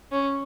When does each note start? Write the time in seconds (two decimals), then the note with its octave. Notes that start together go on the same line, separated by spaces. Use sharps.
0.12 C#4